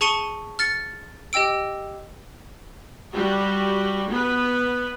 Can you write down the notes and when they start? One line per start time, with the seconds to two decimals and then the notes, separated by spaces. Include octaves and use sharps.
0.01 G#4 A5 C#6 C#7 D#7 G7
0.59 F6 A6 C#7
1.33 G4 D#5 G5 E6 D7
3.13 G3 F#4 G4
4.10 B3 B4